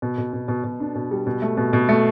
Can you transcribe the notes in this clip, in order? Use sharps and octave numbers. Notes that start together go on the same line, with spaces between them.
B2
B2
B2
B2
B2
D4
B2
G3
B2
A3
B2
B2
A3